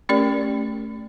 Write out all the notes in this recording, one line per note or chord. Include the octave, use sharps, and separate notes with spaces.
A3 C#4 G4 A#4 D5